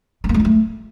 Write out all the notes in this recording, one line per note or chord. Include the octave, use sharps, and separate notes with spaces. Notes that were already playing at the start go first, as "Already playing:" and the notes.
G#3
A#3
G#3
F4
A3